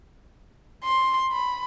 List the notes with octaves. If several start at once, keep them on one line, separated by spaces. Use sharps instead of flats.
C6
B5